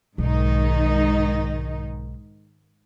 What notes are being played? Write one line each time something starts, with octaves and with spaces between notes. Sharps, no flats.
B1 G#2 D#3 D#4